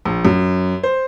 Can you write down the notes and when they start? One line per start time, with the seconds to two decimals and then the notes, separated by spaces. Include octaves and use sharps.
0.05 A#1
0.25 F#2
0.83 C5